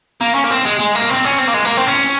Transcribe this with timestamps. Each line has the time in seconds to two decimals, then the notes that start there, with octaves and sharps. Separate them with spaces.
0.21 A#3
0.35 C#4
0.44 A#3
0.50 C4
0.65 G#3
0.79 G#3
0.95 A#3
1.09 C4
1.25 C#4
1.38 C4
1.47 A#3
1.54 G#3
1.65 A#3
1.77 C4
1.87 C#4